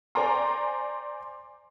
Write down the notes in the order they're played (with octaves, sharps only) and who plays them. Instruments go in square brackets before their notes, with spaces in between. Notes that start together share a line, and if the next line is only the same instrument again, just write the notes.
[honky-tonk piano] C5 D5 G5 G#5 A#5 C6